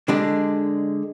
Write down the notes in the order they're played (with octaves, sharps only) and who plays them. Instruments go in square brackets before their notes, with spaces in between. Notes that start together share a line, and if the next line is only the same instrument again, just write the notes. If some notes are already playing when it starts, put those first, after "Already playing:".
[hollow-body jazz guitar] D3 G#3 D4 G4